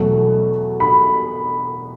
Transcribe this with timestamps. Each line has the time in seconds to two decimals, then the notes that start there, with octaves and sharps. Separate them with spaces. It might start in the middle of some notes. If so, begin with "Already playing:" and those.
Already playing: E2 B2 F#3 A3
0.80 B5